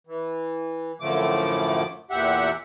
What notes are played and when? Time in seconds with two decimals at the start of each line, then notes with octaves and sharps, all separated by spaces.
0.07 E3
1.00 F#2 A2 D3 F3 A3 D6
2.11 E2 A#2 G4 E5 F#5